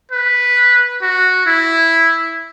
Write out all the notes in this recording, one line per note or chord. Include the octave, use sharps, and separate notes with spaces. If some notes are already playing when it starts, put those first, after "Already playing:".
B4
F#4
E4